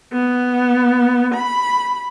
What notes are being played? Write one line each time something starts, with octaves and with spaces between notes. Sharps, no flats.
B3
B5